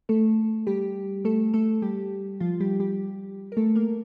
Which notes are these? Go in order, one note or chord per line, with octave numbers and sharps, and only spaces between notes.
A3 A4
G3 G4
A3 A4
A3 A4
G3 G4
F3 F4
G3 G4
G3 G4
A#4
A3 A4
A#3 A#4